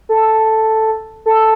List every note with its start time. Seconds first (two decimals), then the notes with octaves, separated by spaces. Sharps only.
0.09 A4
1.26 A4